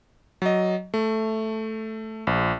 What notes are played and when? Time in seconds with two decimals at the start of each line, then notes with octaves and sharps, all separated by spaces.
0.42 F#3 D#5
0.94 A3
2.27 A#1